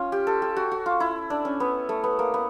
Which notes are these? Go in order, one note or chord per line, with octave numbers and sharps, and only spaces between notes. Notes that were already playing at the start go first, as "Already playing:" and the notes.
Already playing: C#4 F4
G4
A4
G4
F#4
F#4
F4
E4
D4
C#4
B3
A3
B3
A#3
B3